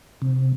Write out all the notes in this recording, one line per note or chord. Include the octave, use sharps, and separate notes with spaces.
C3